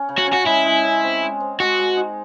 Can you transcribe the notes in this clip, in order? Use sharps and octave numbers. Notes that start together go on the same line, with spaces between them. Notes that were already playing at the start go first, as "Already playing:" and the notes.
Already playing: C#4
C#3
F#4
C#4
F#4
G#3 E4
G#3
C#4
C4
G#3
C4
G#3 F#4
G#3
D#4